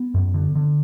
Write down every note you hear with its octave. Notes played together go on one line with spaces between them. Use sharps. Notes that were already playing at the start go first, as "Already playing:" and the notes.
Already playing: B3
F#2
D3
D3